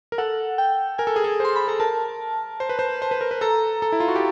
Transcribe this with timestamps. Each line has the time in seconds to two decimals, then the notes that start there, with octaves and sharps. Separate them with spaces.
0.12 A#4
0.18 A4 F#5
0.58 G5
0.98 A#4 G#5
1.07 A4
1.16 G#4
1.24 A4
1.40 C5 C6
1.56 B5
1.68 A4 A#5
1.80 A#4 A5
2.60 C5
2.69 B4
2.79 C5
3.02 C5
3.11 B4
3.21 A#4
3.31 B4
3.41 A4 A#5
3.82 A4
3.92 E4
4.00 F4
4.08 F#4
4.16 G4